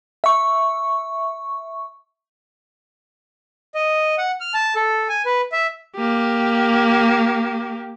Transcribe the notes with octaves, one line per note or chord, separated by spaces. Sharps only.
E5 C#6
D#5
F#5
F6
A5
A4
G#5
B4
E5
A#3 G4